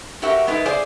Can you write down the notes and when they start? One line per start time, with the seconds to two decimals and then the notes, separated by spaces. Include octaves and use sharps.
0.22 F#4 G4 A#4 E5 G5
0.47 G#3 B3 D#4 E4 A#4
0.66 G#4 C5 D5 F5 G#5